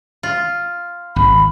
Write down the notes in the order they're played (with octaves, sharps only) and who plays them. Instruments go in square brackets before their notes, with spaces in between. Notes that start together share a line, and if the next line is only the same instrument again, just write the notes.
[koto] F4
[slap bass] G#1 [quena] B5